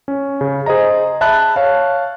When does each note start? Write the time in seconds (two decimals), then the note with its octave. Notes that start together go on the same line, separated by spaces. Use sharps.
0.08 C#4
0.41 C#3
0.66 G#4 C5 D#5 A#5
1.21 E5 A5 B5 F#6
1.56 C#5 F5 A5